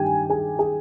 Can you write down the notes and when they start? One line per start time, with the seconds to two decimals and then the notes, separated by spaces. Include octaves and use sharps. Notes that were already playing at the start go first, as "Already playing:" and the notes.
Already playing: G2 D#3 G3 G4 G5 G#5
0.30 G#4 G#5
0.59 G#4 G#5